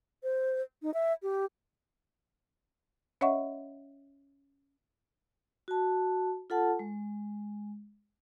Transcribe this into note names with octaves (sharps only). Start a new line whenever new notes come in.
C5
D#4
E5
G4
C#4 C#5 D#5 E5 F#5 C#6
F#4 A5
F4 A4 F#5 A5
G#3